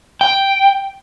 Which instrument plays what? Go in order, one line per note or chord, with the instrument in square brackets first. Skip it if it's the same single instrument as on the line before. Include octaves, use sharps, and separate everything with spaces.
[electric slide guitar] G5